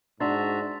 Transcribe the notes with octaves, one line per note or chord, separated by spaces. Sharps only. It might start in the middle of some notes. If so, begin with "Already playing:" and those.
G#2 D4 F#4 E5 A#5 C6 A6